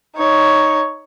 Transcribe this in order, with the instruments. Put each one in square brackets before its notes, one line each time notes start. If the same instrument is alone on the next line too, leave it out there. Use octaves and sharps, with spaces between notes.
[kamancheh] D#4 C#5